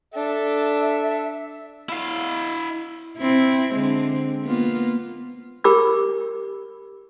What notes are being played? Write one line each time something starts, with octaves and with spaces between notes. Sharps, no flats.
D4 A4 E5
E4 F5
C4 E4
D3 G#3 C4
A#3 B3 F4
G4 A#4 B5 C#6 D6 E6